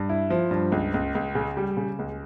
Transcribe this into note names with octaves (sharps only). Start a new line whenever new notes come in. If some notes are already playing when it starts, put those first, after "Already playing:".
Already playing: G2
E4
F3
G2
C#2
C#2
C#2
C#3
G3
C#3
C#2